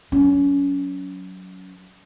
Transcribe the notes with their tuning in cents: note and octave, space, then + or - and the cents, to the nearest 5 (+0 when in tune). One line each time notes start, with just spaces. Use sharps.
F#3 +0 C#4 +25